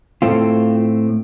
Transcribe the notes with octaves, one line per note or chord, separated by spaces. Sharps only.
A2 A3 C4 F4